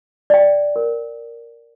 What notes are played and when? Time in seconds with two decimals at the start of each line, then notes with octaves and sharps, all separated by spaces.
0.30 D5 G5
0.76 A#4